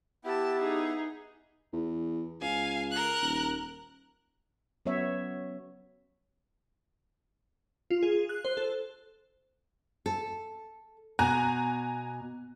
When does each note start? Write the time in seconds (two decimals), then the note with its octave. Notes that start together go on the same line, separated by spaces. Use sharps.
0.25 B3 E4 G4 G5 A5
0.60 D#4 G#4
1.73 E2
2.41 C#2 F5 G#5
2.91 A#4 F#6
3.22 D#1
4.86 F#3 B3 C#4 C#5 E5
7.91 F4
8.03 G#4
8.29 F#6
8.45 C5
8.57 A4
10.06 A4
11.19 B2 G#5 A#5 F#6